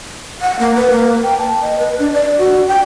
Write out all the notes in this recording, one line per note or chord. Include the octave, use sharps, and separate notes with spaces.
F#5
A#3
B4
A#3
G5
A5
D#5
B4
D4
D5
F#4
G5